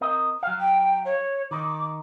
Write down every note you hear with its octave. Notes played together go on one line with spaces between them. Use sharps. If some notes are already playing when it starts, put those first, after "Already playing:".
C4 A#4 D#5
F#3 F5
G5
C#5
D#3 D#4 D6